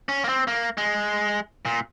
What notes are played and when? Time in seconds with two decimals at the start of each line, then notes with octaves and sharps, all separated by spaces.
0.09 C#4
0.24 A#3
0.29 C4
0.47 A#3
0.77 G#3
1.65 A#2